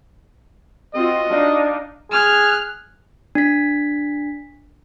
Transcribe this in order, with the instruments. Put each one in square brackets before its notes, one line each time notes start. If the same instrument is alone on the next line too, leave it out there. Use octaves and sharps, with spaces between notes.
[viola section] C4 F4 F#4 [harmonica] D#5
[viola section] D4 D#4 F5 [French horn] D5
[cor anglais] G#4 [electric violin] F6 F#6
[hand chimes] D4 B6